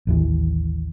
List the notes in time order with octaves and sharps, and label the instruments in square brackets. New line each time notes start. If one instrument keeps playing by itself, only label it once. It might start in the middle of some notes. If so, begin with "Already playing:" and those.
[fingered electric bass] A1 D#2 E3